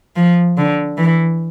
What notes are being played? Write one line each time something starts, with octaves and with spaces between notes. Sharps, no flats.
F3
D3
E3